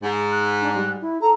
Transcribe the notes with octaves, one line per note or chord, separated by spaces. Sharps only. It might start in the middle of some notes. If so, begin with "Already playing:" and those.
G#2
F#6
D4
G3
E4
A4 A#5